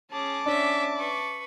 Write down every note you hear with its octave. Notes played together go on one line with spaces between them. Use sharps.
C#4 G#4 A5 D6
C#4 D4 E5
B4 C#6